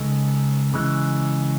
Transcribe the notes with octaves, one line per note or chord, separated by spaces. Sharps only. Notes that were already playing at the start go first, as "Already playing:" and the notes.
Already playing: C#2 C#3 G#3 D#4 A4
C#3 E3 G#3